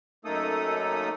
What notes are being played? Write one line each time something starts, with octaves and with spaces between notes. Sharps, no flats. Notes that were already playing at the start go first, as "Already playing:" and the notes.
F#2 A3 A#3 D#4 A4 D#6